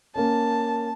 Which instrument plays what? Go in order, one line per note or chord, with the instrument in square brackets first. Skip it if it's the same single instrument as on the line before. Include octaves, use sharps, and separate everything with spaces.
[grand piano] A#3 C#4 [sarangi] A5